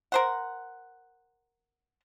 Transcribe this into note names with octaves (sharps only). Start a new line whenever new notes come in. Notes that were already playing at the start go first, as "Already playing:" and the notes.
A#4 C5 F#5